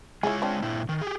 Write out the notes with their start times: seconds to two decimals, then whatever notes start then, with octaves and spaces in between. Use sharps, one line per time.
0.23 G#3 E4 F4 G#4 C#5
0.42 C4 D4
0.62 A#2 E4
0.89 D#3
1.02 G4 G#4